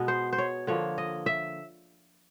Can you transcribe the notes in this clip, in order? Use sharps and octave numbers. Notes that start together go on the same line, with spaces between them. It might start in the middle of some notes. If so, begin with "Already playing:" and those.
Already playing: B2 G#3 B3
C5
C5
C#5
D3 F3 A#3 C#5
D#5
E5